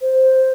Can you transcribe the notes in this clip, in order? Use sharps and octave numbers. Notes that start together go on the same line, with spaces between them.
C5